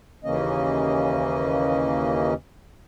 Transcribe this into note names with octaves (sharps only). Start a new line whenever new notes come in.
D#2 C#3 E3 A#3 C#4 D#5